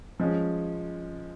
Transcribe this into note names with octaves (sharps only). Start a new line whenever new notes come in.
F3 G#3 C#4